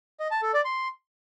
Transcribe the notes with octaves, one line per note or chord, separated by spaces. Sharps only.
D#5
A5
A4
D5
C6